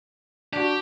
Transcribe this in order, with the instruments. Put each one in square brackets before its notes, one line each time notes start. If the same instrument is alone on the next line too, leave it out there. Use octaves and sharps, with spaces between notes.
[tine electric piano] D4 F#4 [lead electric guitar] G4